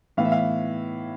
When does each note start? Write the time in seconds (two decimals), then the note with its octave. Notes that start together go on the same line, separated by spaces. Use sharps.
0.17 A2 E3 B3 F5
0.25 E5
0.32 F5